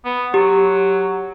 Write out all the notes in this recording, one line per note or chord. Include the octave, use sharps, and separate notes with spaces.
B3
F#3 G4